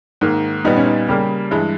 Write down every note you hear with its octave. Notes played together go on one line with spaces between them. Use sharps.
G#2 D#3 A#3
A#2 G3 B3 D#4
C#4
D#4
C#3 G3 A#3 G4
G2 E3 G#3